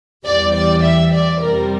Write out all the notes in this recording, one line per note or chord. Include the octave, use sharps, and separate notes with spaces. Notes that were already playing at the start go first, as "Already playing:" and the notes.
E2 E3 G3 D5
D5
E5
D5
F2 C3 G3 A#4